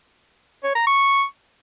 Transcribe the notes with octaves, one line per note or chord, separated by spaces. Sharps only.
C#5
A#5
C#6